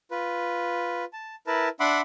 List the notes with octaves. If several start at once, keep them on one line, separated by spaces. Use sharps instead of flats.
F4 B4
A5
E4 A#4 B4 A5
D4 E5 F#5 B5 C6 D6